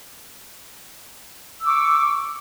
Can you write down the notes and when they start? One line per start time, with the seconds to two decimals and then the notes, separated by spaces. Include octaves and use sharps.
1.61 E6
1.64 D6
1.67 C#6